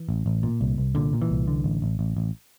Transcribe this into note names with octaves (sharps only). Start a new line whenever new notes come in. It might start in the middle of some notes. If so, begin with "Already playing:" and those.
Already playing: E3
A1
A1
A#2
C2
C2
A#2 D3
A#2
E3
C2
D3
A1
A1
A1
A1